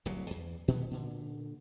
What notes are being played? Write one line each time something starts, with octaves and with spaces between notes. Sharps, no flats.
D1 C2 A#2 F#3
E2
A#2 D#3 E3 B3
A#2 D3